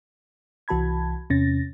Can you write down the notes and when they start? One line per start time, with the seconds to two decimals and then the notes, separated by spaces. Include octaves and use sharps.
0.68 C2 E3 F#4 A5 B5 G#6
1.30 E2 C3 C#4 A6 A#6